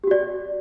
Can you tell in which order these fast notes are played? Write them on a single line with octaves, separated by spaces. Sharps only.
G4 F#4 D5